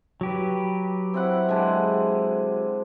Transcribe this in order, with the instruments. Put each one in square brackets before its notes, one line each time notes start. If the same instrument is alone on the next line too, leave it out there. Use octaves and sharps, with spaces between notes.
[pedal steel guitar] F#3 G4 B4
[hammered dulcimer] C4 E4 F#5
D3 G#3